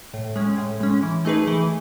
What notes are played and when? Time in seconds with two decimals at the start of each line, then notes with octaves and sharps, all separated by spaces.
0.14 A2
0.36 G#3 C#4
0.58 A2
0.81 G#3 C#4
1.03 E3
1.25 A3 D#4 G#4 B4
1.47 E3